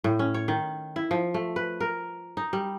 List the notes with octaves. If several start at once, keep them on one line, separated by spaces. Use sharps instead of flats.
A2
C#4
C#5
D#3
E4
F3
A3
B4
A#4
D#4
G3